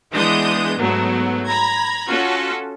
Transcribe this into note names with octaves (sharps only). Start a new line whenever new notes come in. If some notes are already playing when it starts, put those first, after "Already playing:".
E3 G#3 B3 D4 D#6 G6
G#2 F#3 A3 B3
A#5 B5 G#6
C#4 F4 F#4 A4